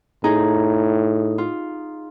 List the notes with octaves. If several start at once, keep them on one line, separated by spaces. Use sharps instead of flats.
A2 D#4 G#4
F4